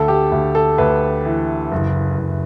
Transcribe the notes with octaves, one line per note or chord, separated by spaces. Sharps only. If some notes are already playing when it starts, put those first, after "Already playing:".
Already playing: D2 A4
G4
D2
A4
D2 B4
E3
F#1
F#1